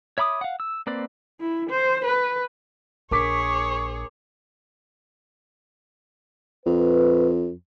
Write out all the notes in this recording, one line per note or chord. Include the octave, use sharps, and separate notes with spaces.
C#5 E5 B5 D6 D#6
F5 F#5
E6
A#3 C4 B4 D5
E4
C5
B4
A#1 G#4 A#4 C#5 C#6 D6 B6
F2 B4